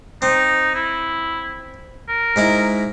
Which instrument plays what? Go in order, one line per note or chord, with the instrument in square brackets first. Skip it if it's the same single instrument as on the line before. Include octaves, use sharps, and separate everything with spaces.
[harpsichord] C4 [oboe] D#4
[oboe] E4
A#4
[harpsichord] G#2 D#4 E4